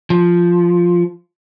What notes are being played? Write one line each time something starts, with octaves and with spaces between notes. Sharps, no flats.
F3